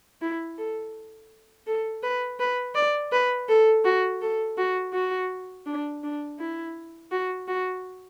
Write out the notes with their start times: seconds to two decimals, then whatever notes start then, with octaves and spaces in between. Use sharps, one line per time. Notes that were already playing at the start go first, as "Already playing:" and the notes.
0.22 E4
0.58 A4
1.67 A4
2.03 B4
2.40 B4
2.75 D5
3.12 B4
3.49 A4
3.85 F#4
4.22 A4
4.58 F#4
4.93 F#4
5.66 D4
6.03 D4
6.39 E4
7.11 F#4
7.48 F#4